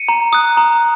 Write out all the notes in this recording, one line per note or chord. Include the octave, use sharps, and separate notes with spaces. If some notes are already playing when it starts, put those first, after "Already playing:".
Already playing: C#7 D#7
A#5
D#6 F#6
A#5